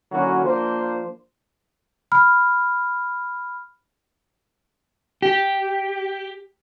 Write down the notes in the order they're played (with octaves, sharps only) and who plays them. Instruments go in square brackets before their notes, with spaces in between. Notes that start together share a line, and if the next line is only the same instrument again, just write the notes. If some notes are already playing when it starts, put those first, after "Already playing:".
[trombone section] D3 F#3 A#3 C#4 E4 F#4
F3 A#3 D4 C5
[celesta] B5 F6
[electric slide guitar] G4